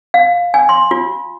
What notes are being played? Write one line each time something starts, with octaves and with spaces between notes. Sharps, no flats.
F5
G#5
C6
F4